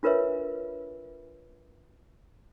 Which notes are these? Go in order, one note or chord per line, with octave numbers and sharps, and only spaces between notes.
D4 F4 A#4 B4 C#5 E5